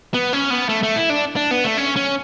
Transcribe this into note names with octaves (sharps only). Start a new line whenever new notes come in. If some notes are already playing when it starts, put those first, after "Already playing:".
B3
C#4
B3
A3
A3
E4
D4
D4
B3
A3
C#4
C#4